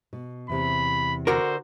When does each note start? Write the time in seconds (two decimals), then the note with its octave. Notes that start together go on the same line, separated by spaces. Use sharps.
0.13 B2
0.49 E2 C3 B5
1.27 D3 F#4 A#4 C5